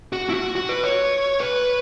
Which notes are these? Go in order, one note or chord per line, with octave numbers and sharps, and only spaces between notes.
F#4
E4
F#4
F#4
B4
C#5
B4